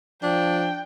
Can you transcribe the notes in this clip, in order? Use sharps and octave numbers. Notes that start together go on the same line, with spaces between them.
F3 D4 G5